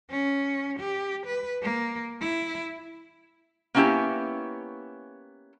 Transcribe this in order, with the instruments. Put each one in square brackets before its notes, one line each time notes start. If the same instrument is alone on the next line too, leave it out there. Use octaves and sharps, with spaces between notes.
[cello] C#4
G4
B4
A#3
E4
[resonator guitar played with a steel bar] A#3 B3 C#4 D#4 E4 G4